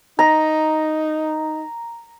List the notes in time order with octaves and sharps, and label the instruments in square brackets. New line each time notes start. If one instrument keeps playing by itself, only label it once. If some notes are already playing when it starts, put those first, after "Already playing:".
[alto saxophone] D#4 [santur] A#5